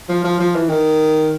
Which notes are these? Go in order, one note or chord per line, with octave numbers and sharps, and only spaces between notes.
F3
F3
F3
E3
D#3